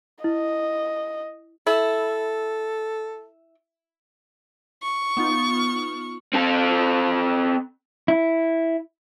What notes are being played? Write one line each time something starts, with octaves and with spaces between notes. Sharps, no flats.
E4 D#5
E4 A4
C#6
B3 D#4 F4
C4 A4
E4